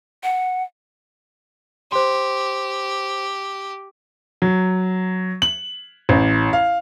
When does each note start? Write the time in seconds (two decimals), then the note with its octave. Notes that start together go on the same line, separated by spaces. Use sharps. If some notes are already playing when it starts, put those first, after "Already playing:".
0.23 F#5
1.92 G4 C5 C6
4.42 F#3
5.42 F#7
6.09 A1
6.53 F5